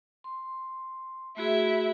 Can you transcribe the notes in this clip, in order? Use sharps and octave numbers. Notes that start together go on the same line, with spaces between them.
C6
A3 E4 F#4 G#4 E5